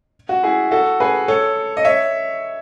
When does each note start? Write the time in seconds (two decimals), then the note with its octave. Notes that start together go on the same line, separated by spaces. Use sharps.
0.29 F#4
0.43 E4 G#4
0.71 F#4 A4
1.00 G#4 B4
1.28 A4 C#5
1.77 D#5
1.84 C#5 E5